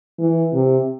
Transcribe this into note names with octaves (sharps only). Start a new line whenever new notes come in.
E3
C3